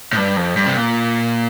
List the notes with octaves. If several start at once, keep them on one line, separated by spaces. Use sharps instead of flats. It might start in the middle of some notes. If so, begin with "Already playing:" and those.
A2
G2
F2
G2
C3
A#2